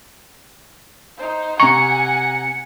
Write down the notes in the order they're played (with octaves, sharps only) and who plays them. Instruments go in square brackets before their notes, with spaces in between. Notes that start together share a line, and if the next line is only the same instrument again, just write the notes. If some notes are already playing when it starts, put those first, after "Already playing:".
[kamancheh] D#4 C5
[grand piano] C3 A#5 [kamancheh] F#5 G#5 [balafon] C#6 [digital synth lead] C#7